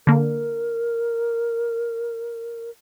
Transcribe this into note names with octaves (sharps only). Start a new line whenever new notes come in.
D3 A#3 A#4